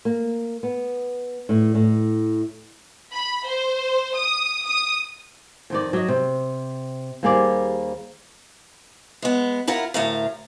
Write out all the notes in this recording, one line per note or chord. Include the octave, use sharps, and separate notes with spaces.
A#3
B3
A2
A2
B5
C5
D#6
D#6
F2 D#3 D5
F#3 D#5
C3
D#2 G3 A#3 G#4 C5 D5
G#3 B3
E4 F4 A#4 F#5
D2 A2 A#4 F5